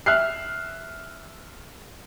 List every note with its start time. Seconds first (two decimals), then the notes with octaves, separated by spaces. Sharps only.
0.06 E5 F6 F#6 C7